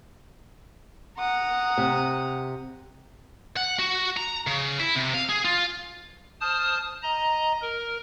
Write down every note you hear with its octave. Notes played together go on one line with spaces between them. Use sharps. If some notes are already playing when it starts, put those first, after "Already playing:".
F#5 A#5 D#6
C3
F#5
F#4
A#5
C#3
E4
C3
F5
G#4
F4
C5 A5 D#6 F6
D#5 A#5
A#4